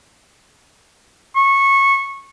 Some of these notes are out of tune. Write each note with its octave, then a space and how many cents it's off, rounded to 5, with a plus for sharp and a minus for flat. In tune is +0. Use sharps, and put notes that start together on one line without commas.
C#6 -15